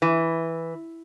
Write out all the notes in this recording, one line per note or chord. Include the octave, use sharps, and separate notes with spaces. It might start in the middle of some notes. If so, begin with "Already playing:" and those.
E3